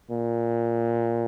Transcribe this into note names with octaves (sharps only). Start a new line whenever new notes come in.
A#2